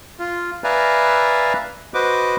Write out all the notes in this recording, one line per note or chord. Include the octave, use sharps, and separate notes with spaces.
F4
B4 D5 E5 F5 G#5 A#5
F#4 B4 C5 D#5 D6